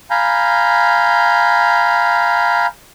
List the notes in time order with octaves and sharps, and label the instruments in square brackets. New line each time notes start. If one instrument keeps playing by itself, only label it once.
[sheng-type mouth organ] F5 G#5 A#5 B5 G6